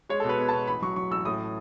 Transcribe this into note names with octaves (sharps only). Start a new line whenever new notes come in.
G#3 C#5
B2 A4
B4
B3
B2 A5
A1 B5
F#3 C#6
F#3 C#6
A1 E6
A2 D#6